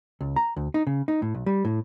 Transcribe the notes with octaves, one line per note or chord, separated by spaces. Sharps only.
C#2
A#5
D2
D#4
C#3
D#4
A2
B1
G3
A2